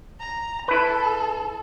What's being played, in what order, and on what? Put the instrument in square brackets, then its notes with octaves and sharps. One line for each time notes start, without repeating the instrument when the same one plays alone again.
[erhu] A#5
[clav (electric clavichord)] E4 B4 [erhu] A4